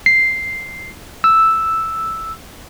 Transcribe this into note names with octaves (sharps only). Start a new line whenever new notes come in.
C7
E6